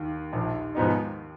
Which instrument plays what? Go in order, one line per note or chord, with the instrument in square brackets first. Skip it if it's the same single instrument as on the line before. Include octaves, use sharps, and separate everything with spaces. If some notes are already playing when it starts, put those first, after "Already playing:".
Already playing: [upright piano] D#2 D#3
[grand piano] A#1
G#2 F3 B3 D#4